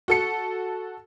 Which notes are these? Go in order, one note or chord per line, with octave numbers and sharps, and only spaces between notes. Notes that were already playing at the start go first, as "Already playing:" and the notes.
F#4 A4 C#7